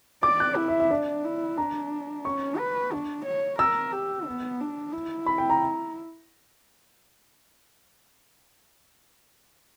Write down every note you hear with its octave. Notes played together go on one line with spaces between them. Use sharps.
D5 D6
F#6
E4
E5
E5
D4 D5
E4
D4 A#5
C#4 C#6
B4
D4
C#5
A#4 E6
G4
B3
D4
E4
B5
G5
A#5